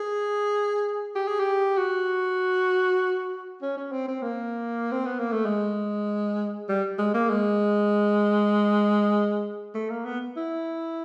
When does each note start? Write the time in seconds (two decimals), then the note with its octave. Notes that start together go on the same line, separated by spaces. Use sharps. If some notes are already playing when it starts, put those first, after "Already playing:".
Already playing: G#4
1.16 G4
1.28 G#4
1.40 G4
1.77 F#4
3.62 C#4
3.77 C#4
3.92 C4
4.08 C4
4.22 A#3
4.92 C4
5.06 B3
5.19 A#3
5.32 A3
5.45 G#3
6.69 G3
6.99 G#3
7.14 A#3
7.29 G#3
9.75 A3
9.90 A#3
10.05 B3
10.37 E4